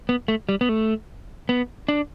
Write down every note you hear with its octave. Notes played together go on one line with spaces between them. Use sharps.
B3
A3
G3
B3
A3
B3
D4